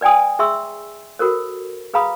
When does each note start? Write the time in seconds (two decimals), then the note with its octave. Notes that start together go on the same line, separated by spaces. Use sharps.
0.01 B4 D5 G5 G#5 D#6
0.39 G#4 E5 C6 C#6 E6
1.19 F#4 A4 A#4 C5
1.94 G#4 B4 F5 A#5 B5 D#6